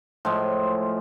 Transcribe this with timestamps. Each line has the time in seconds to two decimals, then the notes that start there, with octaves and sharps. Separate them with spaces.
0.25 A2 F3 G#3